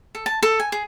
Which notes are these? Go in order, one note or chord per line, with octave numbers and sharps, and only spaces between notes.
A4
A5
A4
G#5
G#4